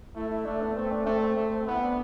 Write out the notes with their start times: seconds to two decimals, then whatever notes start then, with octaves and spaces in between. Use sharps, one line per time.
0.15 A3 E4
0.30 E4
0.45 A3 D4
0.61 B3
0.76 A3 C4
0.91 D4
1.05 A3 C4
1.20 C4
1.36 A3
1.67 B3 E4
1.81 D4